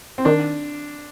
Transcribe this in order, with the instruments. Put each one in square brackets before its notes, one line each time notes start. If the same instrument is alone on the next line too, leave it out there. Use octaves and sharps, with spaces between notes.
[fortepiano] C4
[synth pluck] D#3 [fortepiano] D4